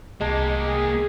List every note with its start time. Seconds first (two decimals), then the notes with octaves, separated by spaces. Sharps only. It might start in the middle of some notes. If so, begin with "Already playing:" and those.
0.21 C2 G#3 A#3 G4 A5
0.66 G#4